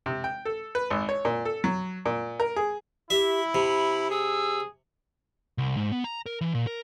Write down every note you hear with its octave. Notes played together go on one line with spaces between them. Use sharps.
C3
G5
A4
B4
G#1
C#5
A#2
A4
F#3
A#2
A#4
G#4
E4 G4 E5
C3 B5
G#4 E6
C2
G#2
B3
A#5
A#4
E3
A#2
A#4